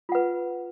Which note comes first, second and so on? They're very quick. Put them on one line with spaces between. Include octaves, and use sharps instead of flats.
F4 F#5 B4